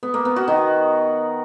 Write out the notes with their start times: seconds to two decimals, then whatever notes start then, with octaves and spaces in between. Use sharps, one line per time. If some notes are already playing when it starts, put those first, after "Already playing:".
0.03 B3
0.14 A#3
0.25 B3
0.36 F#4
0.48 D#3